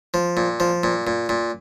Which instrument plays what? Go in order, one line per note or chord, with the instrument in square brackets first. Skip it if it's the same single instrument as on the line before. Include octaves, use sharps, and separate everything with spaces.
[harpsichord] F3
A#2
F3
A#2
A#2
A#2